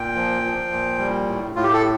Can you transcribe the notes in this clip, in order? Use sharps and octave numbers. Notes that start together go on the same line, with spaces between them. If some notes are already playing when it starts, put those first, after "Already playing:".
Already playing: A#2 G5
F3
F3
A#2
G3
A2
A2 F4
G4
A4